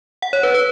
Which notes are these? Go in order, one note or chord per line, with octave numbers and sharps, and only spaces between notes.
F#5
C#5
B4
B4